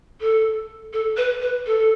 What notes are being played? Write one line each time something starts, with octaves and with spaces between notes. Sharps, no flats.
A4
A4
B4
B4
A4